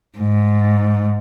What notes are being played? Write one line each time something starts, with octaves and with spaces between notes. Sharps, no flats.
G#2